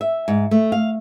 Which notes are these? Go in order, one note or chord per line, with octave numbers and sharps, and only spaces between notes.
E5
G#2
A3
F5